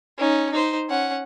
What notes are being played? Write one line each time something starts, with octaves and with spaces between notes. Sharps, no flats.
C#4 D#4
D#4 C5
C#4 F#5